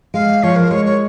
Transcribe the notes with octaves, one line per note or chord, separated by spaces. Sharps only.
G#3 F5
F3 C#5
A#4
G#3 C#5
C#5